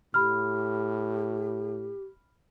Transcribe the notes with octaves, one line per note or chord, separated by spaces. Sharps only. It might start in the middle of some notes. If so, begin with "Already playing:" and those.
A2 G4 B5 F6